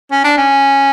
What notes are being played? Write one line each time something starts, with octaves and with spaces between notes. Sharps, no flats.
C#4
D4
C#4